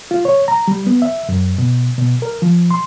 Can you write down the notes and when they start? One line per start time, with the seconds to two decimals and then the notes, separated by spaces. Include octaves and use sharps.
0.11 F4
0.25 C#5
0.48 A#5
0.68 G3
0.87 B3
1.02 E5
1.29 F#2
1.58 B2
1.98 B2
2.22 A#4
2.42 F3
2.71 C6